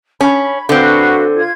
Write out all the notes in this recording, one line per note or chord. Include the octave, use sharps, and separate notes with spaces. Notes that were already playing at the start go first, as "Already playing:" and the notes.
C#4 B5
D3 C4 F#4 B4 F5
F4 G#6